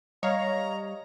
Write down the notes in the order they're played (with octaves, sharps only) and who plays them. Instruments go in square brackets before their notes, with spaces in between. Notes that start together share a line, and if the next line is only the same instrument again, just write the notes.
[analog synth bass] G3 [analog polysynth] C#5 F5 [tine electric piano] D#5 [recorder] A#5